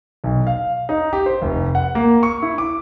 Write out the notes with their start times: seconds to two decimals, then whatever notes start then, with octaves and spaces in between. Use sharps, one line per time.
0.24 B1
0.47 F5
0.89 D#4
1.13 G4
1.26 C5
1.42 F1
1.75 F#5
1.95 A#3
2.23 C#6
2.42 E4
2.58 D6